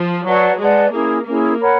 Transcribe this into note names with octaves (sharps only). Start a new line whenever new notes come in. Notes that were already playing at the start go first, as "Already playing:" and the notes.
Already playing: F3
F#3 B4 D5 F#5 A5
G#3 B4 D5 F#5 A5
A#3 C#4 E4 G#4
A#3 C#4 E4 G#4
A#4 C#5 F#5 B5